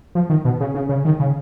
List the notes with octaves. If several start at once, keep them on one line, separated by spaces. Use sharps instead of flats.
F3
D#3
B2
C#3
C#3
C#3
D#3
C#3